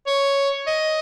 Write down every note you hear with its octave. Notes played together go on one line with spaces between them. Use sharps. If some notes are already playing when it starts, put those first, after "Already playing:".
C#5
D#5